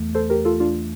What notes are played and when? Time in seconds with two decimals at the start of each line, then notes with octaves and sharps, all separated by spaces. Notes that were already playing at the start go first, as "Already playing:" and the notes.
Already playing: E2 E3 A3
0.15 A4 C5
0.30 G4 A#4
0.45 F4 A4
0.60 D4 F4